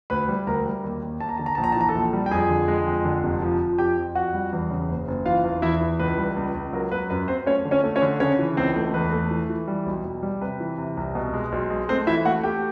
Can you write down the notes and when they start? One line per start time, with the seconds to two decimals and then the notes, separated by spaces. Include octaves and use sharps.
0.10 D2 B4 B5
0.28 G3
0.47 D2 A#4 A#5
0.65 G3
0.84 D#2
1.02 D#2
1.20 D#2 A5
1.29 A#5
1.38 D3 A5
1.46 A#5
1.55 A#1 A5
1.64 A#5
1.72 A5
1.76 E3 A#5
1.89 A4 A5
1.95 A#1
2.13 G3
2.26 G5
2.31 F2 G#4 G#5
2.49 D3
2.68 G#3
2.86 F2
3.05 D3
3.23 F1
3.42 F3
3.60 F3
3.78 F2 G4 G5
3.96 F2
4.15 F2 F#4 F#5
4.33 G3
4.52 E2
4.71 C#3
4.89 F#1
5.08 F#1
5.26 E3 F4 F5
5.44 E2
5.62 E2 E4 E5
5.81 E3
5.99 C#2 B4
6.18 G3
6.36 C#2
6.55 C#2
6.73 F#3 A#4
6.91 F#3 B4
7.10 F#2 B4
7.28 F#3 C4 C5
7.47 A3 C#4 C#5
7.65 D3
7.71 C#4 C#5
7.84 A3
7.96 C#4 C#5
8.02 D3
8.20 C#3 C#4 C#5
8.39 E3
8.57 C#2 C4 C5
8.76 A3
8.94 E2 B4
9.12 A3
9.31 E3
9.50 E3
9.68 G3
9.86 B1
10.05 B1
10.23 G3
10.41 C3 B4
10.60 E3
10.78 C3
10.97 C2
11.15 B2
11.34 G#3
11.52 B1
11.70 G#3
11.89 A3 C4 C5
12.07 E3 E4 E5
12.25 A3 F#4 F#5
12.44 A3 G4 G5